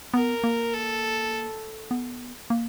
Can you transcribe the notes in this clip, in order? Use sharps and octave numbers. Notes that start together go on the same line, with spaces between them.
B3 A#4
A#3
A4
B3
A#3